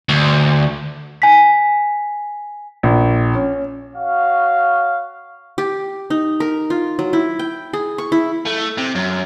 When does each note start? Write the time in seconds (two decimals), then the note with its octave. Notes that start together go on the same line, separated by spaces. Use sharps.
0.09 D2
1.22 G#5 B6
2.83 A#1
3.35 C#4
3.96 F#4 C#5 F5
5.58 G4
6.10 D#4
6.40 A#4
6.70 F4
6.99 F#3
7.13 E4
7.39 G5
7.73 G#4
7.98 C#6
8.12 E4
8.46 A3
8.78 C3
8.95 F#2